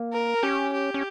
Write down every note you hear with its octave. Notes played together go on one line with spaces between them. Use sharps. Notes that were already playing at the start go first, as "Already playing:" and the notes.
Already playing: A#3
A#4
C#4 G4
G4
C#4